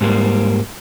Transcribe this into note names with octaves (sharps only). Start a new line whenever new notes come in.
G#2 G3 A#3